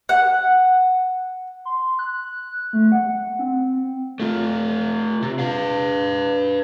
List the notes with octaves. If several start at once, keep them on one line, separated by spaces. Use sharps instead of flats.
F#5
C6
F#6
A3
F#5
C4
A3 F4
C3
B4 F5